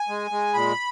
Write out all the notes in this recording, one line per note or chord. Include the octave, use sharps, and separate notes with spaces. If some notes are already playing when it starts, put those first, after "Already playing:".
Already playing: G#5
G#3
G#3
A#2 B5